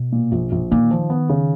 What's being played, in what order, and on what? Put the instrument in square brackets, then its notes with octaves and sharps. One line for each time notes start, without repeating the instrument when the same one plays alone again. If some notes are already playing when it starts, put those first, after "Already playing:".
Already playing: [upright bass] B2
[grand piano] A#2
A#1
A#1
[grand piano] A#2 [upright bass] D#3
[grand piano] F3
B3
C#3